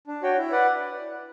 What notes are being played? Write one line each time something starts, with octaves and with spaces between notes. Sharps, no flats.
D4
F#4 C#5 G5
E4
B4 D5 F#5